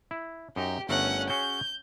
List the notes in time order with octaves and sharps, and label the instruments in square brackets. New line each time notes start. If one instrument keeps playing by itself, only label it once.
[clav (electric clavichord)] E4
[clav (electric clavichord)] F#2 D#4 A#5 [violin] G4
[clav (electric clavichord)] G1 A3 A#4 [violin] C#4 F#5
[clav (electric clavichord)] C#4 F#4 G#4 [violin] G6